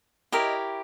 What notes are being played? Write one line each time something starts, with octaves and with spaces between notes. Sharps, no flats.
E4 G4 A#4 C#5 D#5